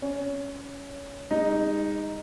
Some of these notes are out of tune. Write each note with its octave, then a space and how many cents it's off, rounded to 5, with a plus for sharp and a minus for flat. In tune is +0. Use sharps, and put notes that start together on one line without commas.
C#4 +10 C#5 +25
G#3 -40 D#4 +0